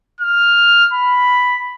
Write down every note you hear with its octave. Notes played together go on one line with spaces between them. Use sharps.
F6
B5